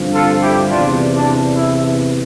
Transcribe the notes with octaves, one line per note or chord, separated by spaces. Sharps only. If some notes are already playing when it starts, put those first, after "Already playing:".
Already playing: G2 D3 F3 C4
F4 A4
E4 G4
E2 C3 E3 D4 F4
D4
E4